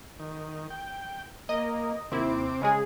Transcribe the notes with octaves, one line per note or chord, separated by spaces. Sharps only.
D#3
G5
A#3 D#5
D#2 C3 C4 E4 D6
C#3 G#3 G#4